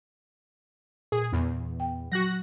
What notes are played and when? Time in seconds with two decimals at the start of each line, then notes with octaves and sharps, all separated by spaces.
1.12 A#2 G#4
1.33 E2
1.80 G5
2.12 F#3 F#4 F#6 A#6